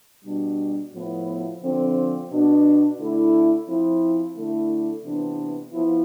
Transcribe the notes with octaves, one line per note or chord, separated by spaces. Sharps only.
B2 G3 D4
A2 F3 B3 E4
D3 F3 C4
B2 B3 D4
D3 A3 E4
F3 C4 E4
D3 A3 E4
C3 E3 B3 D4
F3 B3 E4